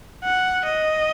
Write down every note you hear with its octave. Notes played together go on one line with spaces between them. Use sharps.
F#5
D#5